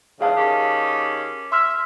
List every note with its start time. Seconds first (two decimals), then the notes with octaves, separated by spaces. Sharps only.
0.21 E2 G#2 C#3 G#4 F5 A5
0.38 D#3 C#4 G4
1.52 E5 C6 E6 F6